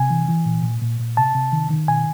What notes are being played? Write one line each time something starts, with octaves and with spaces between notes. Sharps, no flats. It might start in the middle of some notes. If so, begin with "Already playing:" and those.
Already playing: C3 G#5
E3
E3
A#2
A#2
A#2
A#2
C3 A5
C3
D#3
D#3
B2 G#5